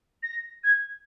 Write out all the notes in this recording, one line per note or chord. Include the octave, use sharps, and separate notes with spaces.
A#6
G#6